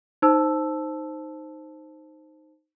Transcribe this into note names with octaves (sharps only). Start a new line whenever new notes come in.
D#4 C5 A5 E6